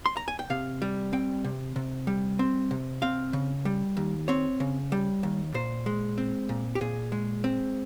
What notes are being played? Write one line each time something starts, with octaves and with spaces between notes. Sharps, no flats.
C6
A#5
G#5
G5
C3 F5
G3
C4 G5
C3
C3
G3
C4
C3
C4 F5
C#3
G3
D#2
C4 C#5
C#3
G3
D#2
A#2 C5
G#3
C4
A#2
G4
A#2 G#4
G#3
C4